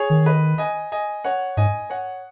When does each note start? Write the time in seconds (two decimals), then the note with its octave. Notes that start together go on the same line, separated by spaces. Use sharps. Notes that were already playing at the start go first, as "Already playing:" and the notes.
Already playing: G#4 C#5
0.10 D#3
0.26 B4 D#5
0.58 D#5 G#5
0.92 D#5 G#5
1.24 C#5 F#5
1.57 G#2 D#5 G#5
1.90 C#5 F#5